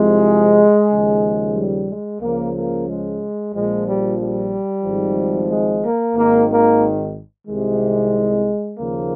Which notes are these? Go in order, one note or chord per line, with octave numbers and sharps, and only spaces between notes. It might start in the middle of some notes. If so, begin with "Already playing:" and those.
Already playing: C2 C3 F3 G#3
D#2 C#3 F3
G3
G#3
C#2 C#3 F3 A#3
A#3
G#3
A#1 A#2 F3 G#3
G3
G3
G#1 G#2 F3
G#3
A#3
G#1 G#2 D#3 A#3
A#3
C2 C3 D#3 G#3
D#2 C#3 F3 A#3